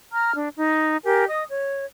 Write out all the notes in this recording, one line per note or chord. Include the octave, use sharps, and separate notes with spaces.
A#5 F6
D4
D#4
G4 A#4 G#5
D#5 D#6
C#5